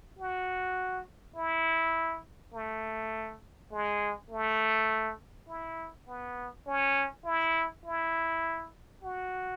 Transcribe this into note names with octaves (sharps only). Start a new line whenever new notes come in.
F#4
E4
A3
G#3
A3
E4
B3
C#4
E4
E4
F#4